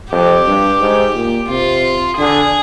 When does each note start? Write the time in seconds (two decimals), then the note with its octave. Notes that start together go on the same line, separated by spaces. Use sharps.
0.12 F2 G4
0.47 G2
0.80 G#2
1.15 A#2
1.49 C3 F4
2.18 D3 G#4